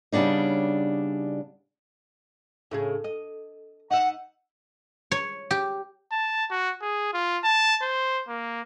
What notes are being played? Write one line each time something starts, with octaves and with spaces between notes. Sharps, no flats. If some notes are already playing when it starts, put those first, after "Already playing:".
C#3 G3 B3 D4 D#4
A2 C#3 G#4
D#5
D#4 E5 F#5
C#5
G4
A5
F#4
G#4
F4
A5
C5
A#3